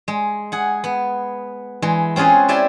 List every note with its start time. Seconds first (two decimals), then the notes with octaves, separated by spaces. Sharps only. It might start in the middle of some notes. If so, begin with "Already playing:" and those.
0.08 G#3
0.52 G#4 F#5
0.84 B3
1.82 E3 G#3
2.16 C4 C#4 F4 G#4 B4
2.48 E4 G4 D5 E5 G#5 C6